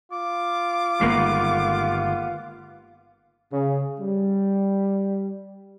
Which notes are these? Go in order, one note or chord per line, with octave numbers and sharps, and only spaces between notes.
F4 D6
G1 D#3 G#3 A#3 B3
C#3
G3